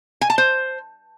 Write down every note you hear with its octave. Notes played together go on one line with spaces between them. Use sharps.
G#5
A5
C5